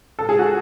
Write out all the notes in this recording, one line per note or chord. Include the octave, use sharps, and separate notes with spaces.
A4
G#4
F#4